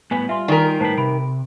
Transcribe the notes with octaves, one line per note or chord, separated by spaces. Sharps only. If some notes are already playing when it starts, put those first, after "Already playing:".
A2 G3 B3 B4 G#5
F4 E5 G#5 C6
D#3 A#4 D5 G#5 B6
A2 B4 C5 A5 C7
C3 B5 D7